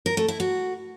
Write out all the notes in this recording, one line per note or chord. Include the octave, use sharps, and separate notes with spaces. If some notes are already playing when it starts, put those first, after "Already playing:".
A#4
A3
E4
F#4